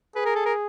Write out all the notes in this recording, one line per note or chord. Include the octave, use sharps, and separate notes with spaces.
G#4 B4
A#4
A4
A#4